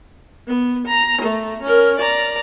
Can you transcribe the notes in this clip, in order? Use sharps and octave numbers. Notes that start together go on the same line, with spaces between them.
B3
A#5
A3
C#4 A#4
D5 A#5